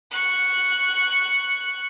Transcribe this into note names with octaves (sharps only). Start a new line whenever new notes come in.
C#6 F#6